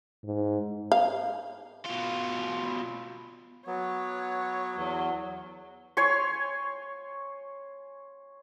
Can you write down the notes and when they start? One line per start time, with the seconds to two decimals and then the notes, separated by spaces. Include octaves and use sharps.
0.24 G#2
0.92 F5
1.85 B2 F4
3.67 F#3 B3 C#5
4.77 E2 F#3
5.97 C#5 G#5 C6 C#6